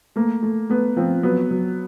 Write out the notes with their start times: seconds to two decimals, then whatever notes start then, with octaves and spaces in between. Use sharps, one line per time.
0.16 A3 A#3
0.43 A3
0.69 A3 B3
0.97 F3 C4
1.23 F#3 B3
1.51 F#3